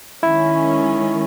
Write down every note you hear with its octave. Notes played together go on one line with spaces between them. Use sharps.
D#3 G#3 C#4 E4